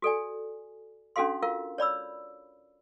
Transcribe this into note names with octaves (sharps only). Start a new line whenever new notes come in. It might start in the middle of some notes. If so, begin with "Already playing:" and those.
F#4 A4 D5 G#5
C#4 D4 F#4 A4 F5 C6
F4 A#4 F5
C#5 D5 B5 E6